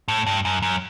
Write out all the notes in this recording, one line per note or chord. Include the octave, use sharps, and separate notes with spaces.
A2
G2
F#2
F#2